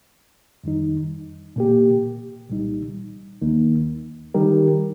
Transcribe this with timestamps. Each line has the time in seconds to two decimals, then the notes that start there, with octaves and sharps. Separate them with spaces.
0.64 F2 D#3 G3 D#4
1.56 A#2 A#3 G4
2.49 C2 A#2 G3 D#4
3.42 D#2 D#3 A#3 D#4
4.34 D#3 G3 D#4 G4 A#4